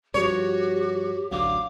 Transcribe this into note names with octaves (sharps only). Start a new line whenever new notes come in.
G2 F3 F#4 G4 C#5
A1 D2 F#3 F5 D6